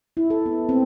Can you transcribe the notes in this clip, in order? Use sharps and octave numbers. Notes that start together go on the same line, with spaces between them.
E4
A4
B3
C4